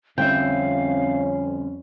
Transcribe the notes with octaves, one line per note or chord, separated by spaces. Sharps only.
F2 D3 G3 C4 C#4 E5 F5 G5